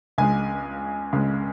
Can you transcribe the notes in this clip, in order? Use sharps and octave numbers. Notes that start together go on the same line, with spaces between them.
C#2 C#3 G#3 G#5
C#2 C#3 G#3